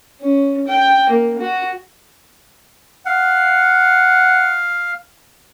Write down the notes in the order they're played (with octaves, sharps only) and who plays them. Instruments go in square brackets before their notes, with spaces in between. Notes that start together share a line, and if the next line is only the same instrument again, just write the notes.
[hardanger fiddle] C#4
G5
A#3
F#4
[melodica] F5 [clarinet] F#5